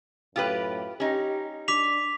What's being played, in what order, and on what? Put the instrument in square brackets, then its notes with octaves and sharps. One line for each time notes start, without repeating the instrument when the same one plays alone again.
[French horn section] F#2 A2 [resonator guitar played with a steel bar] F4 G4 B4
[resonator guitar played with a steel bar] C#4 D#4 [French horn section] G4
[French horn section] D4 [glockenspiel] D6 B6 F7